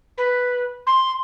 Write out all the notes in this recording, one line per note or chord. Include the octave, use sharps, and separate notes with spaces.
B4
C6